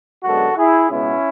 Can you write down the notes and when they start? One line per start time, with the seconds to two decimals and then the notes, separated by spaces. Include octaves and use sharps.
0.24 F#2 D3 G#3 B3 F#4 A4
0.57 E4 G#4
0.90 C#2 B2 G#3 B3 C#4 E4